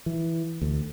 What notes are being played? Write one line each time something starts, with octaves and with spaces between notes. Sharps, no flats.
E3
D2